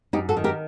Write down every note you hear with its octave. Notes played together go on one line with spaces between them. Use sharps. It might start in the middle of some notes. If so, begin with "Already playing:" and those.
F#2 D#4 G4
F#4 A4
D#3
G4 A#4